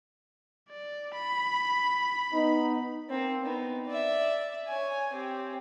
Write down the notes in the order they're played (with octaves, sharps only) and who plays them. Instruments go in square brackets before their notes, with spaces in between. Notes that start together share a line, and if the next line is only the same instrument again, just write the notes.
[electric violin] D5
B5
[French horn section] B3 D#4
[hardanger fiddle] A#3 C4
B3 D#4
D5 E5
C#5 G#5
C4 G4